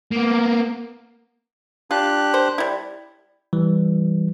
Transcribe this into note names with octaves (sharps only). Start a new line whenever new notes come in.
A#3 B3
D4 F4 G4 F#6
C5
G3 E4
E3 G3